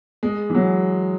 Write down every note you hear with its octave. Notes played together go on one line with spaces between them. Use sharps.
G#3
E3
F#3